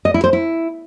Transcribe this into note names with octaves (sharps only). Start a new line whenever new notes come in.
D#5
E4
C5
E4